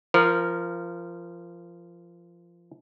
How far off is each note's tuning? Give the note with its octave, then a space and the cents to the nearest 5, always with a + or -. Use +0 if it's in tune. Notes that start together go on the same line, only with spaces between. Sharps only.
F3 -20 A#4 +0